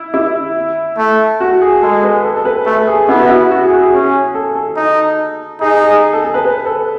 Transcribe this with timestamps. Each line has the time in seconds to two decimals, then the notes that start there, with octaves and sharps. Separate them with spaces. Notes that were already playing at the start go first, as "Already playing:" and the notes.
Already playing: E4
0.14 E4
0.98 A3
1.40 F#4
1.61 G#4
1.82 G#3 A4
2.03 B4
2.24 A4
2.36 A4
2.45 B4
2.66 A3 A4
2.87 G#4
3.08 B3 E4
3.20 F#4
3.29 E4
3.51 F#4
3.65 G#4
3.73 F#4
3.79 G#4
3.93 C#4
4.35 A4
4.55 A4
4.76 D#4
5.61 D#4 G#4
5.82 G#4
6.13 A4
6.24 A4
6.34 B4
6.45 B4
6.66 A4